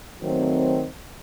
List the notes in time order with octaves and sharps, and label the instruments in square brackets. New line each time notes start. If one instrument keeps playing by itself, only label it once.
[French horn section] D#3 F#3 A3 C4